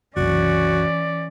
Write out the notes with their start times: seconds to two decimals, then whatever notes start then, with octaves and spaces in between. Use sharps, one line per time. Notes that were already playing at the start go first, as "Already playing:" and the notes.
0.16 F#1 C2 F#2 E3 C#4 F#4 D5